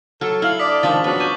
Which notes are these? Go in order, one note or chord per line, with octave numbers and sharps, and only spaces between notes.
F#3 A4 F6
E4 F5 F6 F#7
D4 D5 D6 D#6 B6
G#2 D#3 F3 C#4 D4 A6
F#3 B3 D4 F#4
G#5 C#6 D6 G6